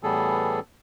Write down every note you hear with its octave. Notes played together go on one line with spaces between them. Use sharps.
A2 E3 G3 B3 G#4 A4